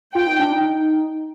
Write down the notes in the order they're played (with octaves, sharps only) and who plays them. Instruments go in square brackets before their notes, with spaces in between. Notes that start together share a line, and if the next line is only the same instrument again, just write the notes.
[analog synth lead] F4 [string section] G5
[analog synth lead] D#4
D4
D#4